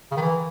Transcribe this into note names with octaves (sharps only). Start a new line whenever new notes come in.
C#3
D#3
E3